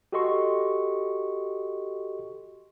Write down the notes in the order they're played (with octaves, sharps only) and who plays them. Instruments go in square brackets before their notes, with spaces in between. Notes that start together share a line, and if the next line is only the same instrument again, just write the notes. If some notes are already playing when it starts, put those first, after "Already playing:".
[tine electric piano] F#4 G4 A4 D#5 C6 C#6